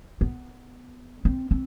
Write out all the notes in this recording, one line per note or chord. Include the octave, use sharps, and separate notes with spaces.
B3
C4
C4